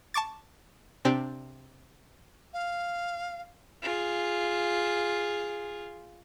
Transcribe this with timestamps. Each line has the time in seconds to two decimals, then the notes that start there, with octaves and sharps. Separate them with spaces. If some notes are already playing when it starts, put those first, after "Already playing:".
0.14 A5 C#6 D6 A6
1.05 C3 C4 D4 G4
2.53 F5
3.82 F4 G#4